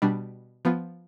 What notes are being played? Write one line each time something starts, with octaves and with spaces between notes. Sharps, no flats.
B2 G3 D4
F3 B3 F4